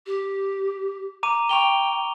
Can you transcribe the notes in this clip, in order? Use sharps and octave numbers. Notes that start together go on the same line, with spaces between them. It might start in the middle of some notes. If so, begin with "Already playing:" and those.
G4
A#5 D6 D#7
G5 C#6 F7 G7